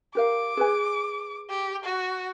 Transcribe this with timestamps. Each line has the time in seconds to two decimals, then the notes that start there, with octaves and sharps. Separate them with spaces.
0.15 G4 A#4 F5 D6
0.57 G#4 B4 G#5
1.49 G4
1.84 F#4